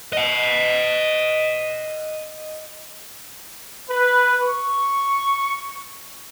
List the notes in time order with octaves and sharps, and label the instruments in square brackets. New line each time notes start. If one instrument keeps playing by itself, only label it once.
[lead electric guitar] D#5 F#5
[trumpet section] B4
C#6